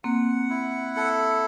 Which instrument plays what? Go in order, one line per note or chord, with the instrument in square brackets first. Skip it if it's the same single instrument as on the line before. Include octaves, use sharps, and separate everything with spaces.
[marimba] A#3 C4 [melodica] F#5
[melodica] E4
A4